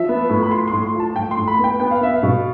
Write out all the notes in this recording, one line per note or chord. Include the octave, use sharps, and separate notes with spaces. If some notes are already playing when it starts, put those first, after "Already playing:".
Already playing: F3 E5
B3
A2
B5
F3 C6
A2 C6
C6
F3
A5
A2 G5
C6
A2
B5
B3
G5
B3 G5
F5
B3 E5
F5
B2